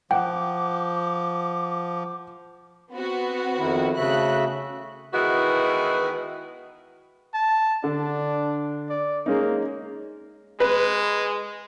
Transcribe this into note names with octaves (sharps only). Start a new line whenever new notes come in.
F3 F#5 G5 D6
B3 C4 F#4
F2 D#3 E4
C#3 A3 F#4 E5 F#6
D#3 E3 G#3 B3 E4 F#4
A5
D3 D4
D5
G#3 A#3 C#4 D#4
G#3 B4